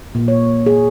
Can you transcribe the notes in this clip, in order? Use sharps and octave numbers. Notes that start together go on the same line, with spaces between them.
A#2
C#5
G#4